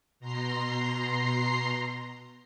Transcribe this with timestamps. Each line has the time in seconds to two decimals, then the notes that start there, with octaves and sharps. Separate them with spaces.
0.20 B2 A#5 C6 C7